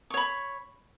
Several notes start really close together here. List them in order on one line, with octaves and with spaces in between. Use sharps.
C#6 C#5 B5